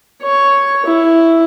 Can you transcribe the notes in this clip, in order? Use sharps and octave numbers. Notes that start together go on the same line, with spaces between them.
C#5
E4